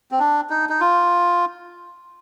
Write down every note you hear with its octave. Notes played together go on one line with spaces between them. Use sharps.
C4
D4
D#4
D#4
F4